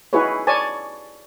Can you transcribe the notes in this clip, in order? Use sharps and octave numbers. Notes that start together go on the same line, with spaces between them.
D#4 E4 F#4 G#4 B4 C#5
C#5 D5 G#5 A5